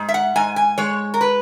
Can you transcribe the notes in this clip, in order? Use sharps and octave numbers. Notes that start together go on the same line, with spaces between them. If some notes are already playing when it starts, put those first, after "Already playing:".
Already playing: G#2
E5
F#5
G#2 G#5
G#5
G#3 C#5
A#4
B4